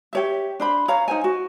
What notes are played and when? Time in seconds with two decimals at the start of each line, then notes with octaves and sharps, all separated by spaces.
0.13 G4 C#5 E5
0.60 D4 C5 B5
0.88 C#5 F5 A#5
1.08 D#4 C5 G#5
1.24 F#4